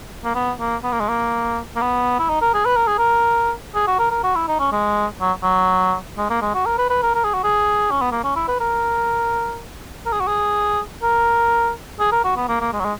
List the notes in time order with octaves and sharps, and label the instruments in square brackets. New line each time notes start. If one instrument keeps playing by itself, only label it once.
[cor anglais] A#3
B3
A#3
B3
A#3
G#3
A#3
A#3
B3
E4
D#4
A#4
G#4
B4
A#4
G#4
A#4
G#4
F#4
A#4
A#4
F#4
E4
D#4
C#4
G#3
F#3
F#3
G#3
A#3
G#3
F#4
A#4
B4
B4
A#4
A#4
G#4
F#4
G#4
C#4
B3
A#3
C#4
E4
B4
A#4
A#4
G#4
F#4
G#4
A#4
G#4
A#4
F#4
B3
A#3
A#3
G#3
F#3
G#3